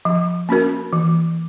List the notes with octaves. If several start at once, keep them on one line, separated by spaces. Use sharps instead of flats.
F3
A#3 C#4 F#4 A#4
E3